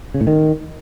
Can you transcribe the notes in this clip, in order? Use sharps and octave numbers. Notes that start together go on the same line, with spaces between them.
C#3
A2
D#3